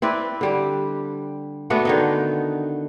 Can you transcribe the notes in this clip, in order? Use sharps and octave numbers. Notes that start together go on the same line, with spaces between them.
C4 E4 B4 D5
D3 G3 G4
A3 B3 D4 F#4
D3 D#3 D#4